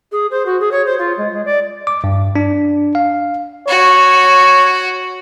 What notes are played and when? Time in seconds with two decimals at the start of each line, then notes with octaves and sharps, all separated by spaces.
0.12 G#4
0.31 C5
0.46 F#4
0.60 G#4
0.71 C#5
0.85 C5
0.99 F4
1.17 G#3
1.32 G#3
1.45 D5
1.87 D6
2.04 G2
2.36 D4
2.95 F5
3.68 F#4 C#5